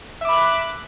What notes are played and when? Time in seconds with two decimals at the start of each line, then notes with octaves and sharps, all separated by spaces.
0.21 E5
0.25 D6
0.29 B5
0.33 F#6